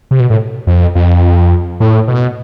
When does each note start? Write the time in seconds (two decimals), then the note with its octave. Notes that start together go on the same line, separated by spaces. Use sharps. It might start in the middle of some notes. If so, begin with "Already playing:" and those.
0.11 C3
0.20 B2
0.30 A2
0.67 F2
0.95 F2
1.80 A2
2.08 B2